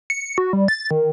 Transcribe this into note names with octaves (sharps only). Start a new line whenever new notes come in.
C#7
F#4
G3
A6
D#3